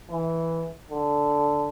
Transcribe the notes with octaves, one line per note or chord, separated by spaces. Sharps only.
E3
D3